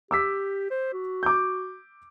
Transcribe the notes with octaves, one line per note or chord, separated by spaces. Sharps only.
G4 D6 E6 B6
C5
F#4
D6 G6